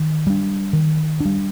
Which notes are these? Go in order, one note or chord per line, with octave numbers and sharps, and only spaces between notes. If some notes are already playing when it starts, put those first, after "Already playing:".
Already playing: D#3
G3 D4
D#3
G3 D4